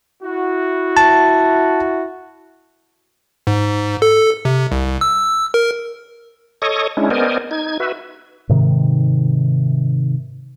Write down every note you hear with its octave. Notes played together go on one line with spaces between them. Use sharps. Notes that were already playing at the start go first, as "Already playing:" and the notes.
E4 F#4
A5
G#2
A4
C3
C2
E6
A#4
A4 C#5 D#5 C#6 D#6
G#3 C#4 D4 E4
B3 A#4 C5 D5 D#5 G#5
D#4 G#6
F#4 B4 E5
G#2 C3 D#3